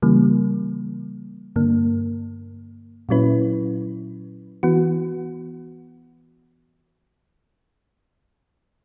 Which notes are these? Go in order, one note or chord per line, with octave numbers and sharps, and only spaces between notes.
C#3 E3 G3 A#3
G2 D3 A#3
A#2 F#3 C#4 E4 B4
E3 B3 F#4